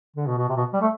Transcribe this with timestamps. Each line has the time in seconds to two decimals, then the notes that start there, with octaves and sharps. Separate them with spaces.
0.16 D3
0.27 B2
0.38 B2
0.49 C3
0.57 B2
0.74 G3
0.82 A3